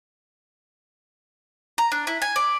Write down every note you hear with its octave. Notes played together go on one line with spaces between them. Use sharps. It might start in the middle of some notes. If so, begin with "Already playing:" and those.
A#5
D4
E4
G#5
D5